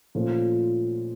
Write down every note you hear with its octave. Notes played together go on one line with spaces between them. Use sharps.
A#2 F3 A3 C#4 F4